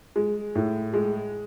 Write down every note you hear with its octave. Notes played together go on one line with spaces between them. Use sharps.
G#3
A2
G#3